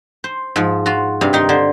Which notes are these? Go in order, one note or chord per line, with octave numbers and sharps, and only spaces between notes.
C5
G#2 F3
F4 F#4
G2 C3 F5
D#3 D#4 C6
D3 C5